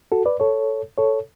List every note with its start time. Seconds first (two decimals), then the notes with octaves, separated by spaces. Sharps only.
0.12 F#4 A4
0.26 B4 D5
0.40 A4 C#5
0.98 A4 C#5